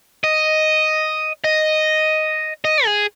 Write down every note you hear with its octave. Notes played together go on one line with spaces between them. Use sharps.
D#5
D#5
D#5
G#4